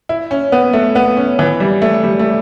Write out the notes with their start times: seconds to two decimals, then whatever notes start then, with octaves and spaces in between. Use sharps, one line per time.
0.09 E4
0.31 C#4
0.52 B3
0.73 A3
0.95 B3
1.17 C#4
1.39 E3
1.60 G3
1.82 A3
2.03 G3
2.19 A3